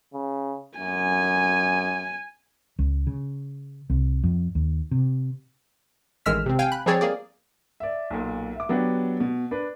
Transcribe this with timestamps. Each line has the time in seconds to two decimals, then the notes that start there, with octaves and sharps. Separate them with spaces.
0.14 C#3
0.80 F#2 G#5
2.79 C#2
3.07 C#3
3.90 C2
4.23 F2
4.55 D#2
4.91 C3
6.26 A1 D#3 G#3 E6 F6 B6
6.46 C3 C4
6.59 F5 G5 G#5
6.72 B5 F#6
6.86 F3 G3 C4 G#4 C#5 D5
7.01 A#3 G#4 D5
7.80 D5 E5
8.11 B1 A#2
8.56 E5 D6
8.69 F#3 B3 D4 F#4 G4
9.20 B2
9.51 D4 B4